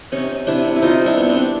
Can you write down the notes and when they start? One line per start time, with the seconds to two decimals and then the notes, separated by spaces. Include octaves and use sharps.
0.12 C3 C#4 D#4
0.30 C3
0.47 C3 D4 E4
0.65 C3
0.76 E4
0.82 C3 D#4 F4
1.00 G3
1.06 D4 E4
1.17 B3
1.29 C4 D4
1.35 B3